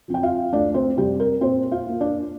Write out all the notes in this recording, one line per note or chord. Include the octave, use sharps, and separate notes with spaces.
F3 C4 F4
G5
F4 F5
D2 D4 D5
C4 C5
C3 G3 C4 G4
A#4
A#2 C4 C5
F4 F5
A#3 F4
D4 D5